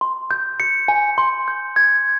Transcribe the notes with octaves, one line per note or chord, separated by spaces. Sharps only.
C6
G6
C#7
G#5
C6
G6
G#6